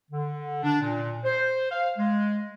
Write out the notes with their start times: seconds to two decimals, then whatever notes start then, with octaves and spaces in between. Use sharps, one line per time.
0.11 D3
0.63 D4
0.81 A#2
1.24 C5
1.71 F5
1.98 G#3